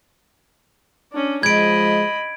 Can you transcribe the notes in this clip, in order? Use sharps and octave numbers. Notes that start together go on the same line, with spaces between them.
C#4 D4
F3 G#3 D#5 B5 G#6 D7